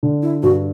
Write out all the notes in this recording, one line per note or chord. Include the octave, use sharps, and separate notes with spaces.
D3
E4
G2 F#4